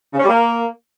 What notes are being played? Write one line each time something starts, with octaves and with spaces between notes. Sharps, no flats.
C#3
C#4
G3
A#3